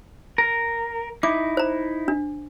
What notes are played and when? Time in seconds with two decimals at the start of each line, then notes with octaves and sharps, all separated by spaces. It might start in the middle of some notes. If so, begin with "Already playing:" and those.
0.38 A#4
1.23 D#4 E4 D6
1.57 C5 A#5
2.08 D4